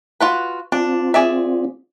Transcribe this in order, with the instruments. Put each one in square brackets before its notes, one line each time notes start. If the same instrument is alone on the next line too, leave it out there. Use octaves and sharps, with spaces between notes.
[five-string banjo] F4 F#4 B4
[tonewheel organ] C4 F4 [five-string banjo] D4
[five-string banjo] G#4 D5 E5